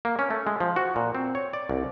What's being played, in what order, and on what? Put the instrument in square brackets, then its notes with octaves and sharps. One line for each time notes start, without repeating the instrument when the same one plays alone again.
[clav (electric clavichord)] A#3
C#4
A3
G#3
F3
F#4
A#2
C4
C#5
D5
C2